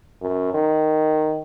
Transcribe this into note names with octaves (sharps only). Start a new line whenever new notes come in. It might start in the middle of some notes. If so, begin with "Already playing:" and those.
F#2
D#3